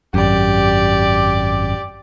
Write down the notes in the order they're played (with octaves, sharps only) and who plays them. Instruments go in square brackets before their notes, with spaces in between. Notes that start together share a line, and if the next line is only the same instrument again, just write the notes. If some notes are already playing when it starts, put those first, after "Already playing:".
[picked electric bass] G#1 F#2 [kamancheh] G4 D5